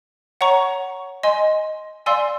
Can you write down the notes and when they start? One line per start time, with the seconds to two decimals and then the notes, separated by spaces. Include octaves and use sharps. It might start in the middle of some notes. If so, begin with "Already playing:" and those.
0.41 C#5 F#5 A#5 C#6
1.23 D#5 G#5 C6
2.06 D5 F5 G#5 C6 E6